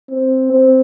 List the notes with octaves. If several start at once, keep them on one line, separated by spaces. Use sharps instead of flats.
C4
C4